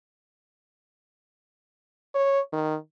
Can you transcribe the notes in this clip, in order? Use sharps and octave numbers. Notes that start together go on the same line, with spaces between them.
C#5
D#3